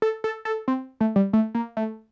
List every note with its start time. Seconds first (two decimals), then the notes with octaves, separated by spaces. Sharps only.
0.02 A4
0.24 A4
0.45 A4
0.68 C4
1.01 A3
1.16 G3
1.33 A3
1.55 A#3
1.77 A3